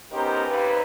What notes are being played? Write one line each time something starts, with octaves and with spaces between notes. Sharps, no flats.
B3 C#4 D#4 G4 A#4 C5
D#2 C3 B4